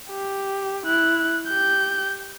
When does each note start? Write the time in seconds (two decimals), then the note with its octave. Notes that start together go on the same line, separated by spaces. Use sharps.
0.10 G4
0.86 E4 F#6
1.49 G4 G6